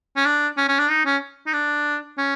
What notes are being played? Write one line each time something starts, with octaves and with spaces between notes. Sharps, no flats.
C#4
D4
C#4
C#4
D4
D#4
C#4
D#4
D4
C#4